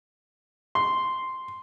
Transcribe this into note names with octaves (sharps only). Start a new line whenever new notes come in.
C6